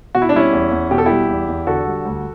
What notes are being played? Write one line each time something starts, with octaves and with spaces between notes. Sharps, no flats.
B2 F#4
E4
D4
G3 C#4 E4
E2
E2
B2 G4
A4
G3 E4 G4
E2
E2
D3 F#4 A4
G3
D2